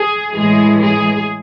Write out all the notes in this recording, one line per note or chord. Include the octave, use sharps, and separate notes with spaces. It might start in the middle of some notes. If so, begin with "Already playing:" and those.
Already playing: G#4
A2 E3 G#3 G#4
G#4